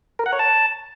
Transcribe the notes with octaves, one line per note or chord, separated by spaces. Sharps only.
A#4
F#5
C#5
A5